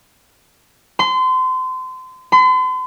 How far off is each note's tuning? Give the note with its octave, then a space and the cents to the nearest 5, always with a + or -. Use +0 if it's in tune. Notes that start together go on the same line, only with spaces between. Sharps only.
C6 -30
C6 -45